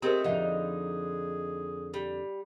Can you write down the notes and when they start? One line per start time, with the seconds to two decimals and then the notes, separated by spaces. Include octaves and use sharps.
0.02 G#3 A3 C4 G4 G#4 A#4 C5
0.24 F2 D3 D#4 E5 F#5
1.94 G3